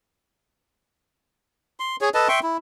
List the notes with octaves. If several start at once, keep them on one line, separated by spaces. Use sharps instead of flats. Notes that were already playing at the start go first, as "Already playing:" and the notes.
C6
G#4 C#5
A4 B4 D#5 A5
E5 G5 C6 C#6
E4